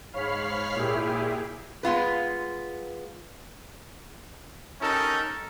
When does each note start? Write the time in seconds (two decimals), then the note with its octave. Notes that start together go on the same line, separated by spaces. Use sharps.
0.13 G#2 C#5 F5 B5 F6 C7
0.75 A#2 E4 G4 G#4
1.83 G#3 B3 F4 B4
4.81 C#4 D#4 G4 A4 A#4